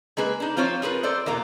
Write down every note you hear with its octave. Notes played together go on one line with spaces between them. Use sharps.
G#3 A#3 G#4 B4
D4 D#4
F3 C4 F4 C5 C#5
F4 G#4 A#4 B4
A4 C5 D5
E2 B2 A#3 A#5